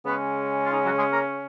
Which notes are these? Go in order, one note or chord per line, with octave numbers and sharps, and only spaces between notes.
C#3 G#3 B3 C#4 B4
F4
D#4
F#3 F#4
G#3 G#4
A#3 A#4